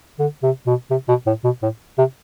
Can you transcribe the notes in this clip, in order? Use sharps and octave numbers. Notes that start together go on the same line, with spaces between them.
D3
C3
B2
C3
B2
A2
B2
A2
C3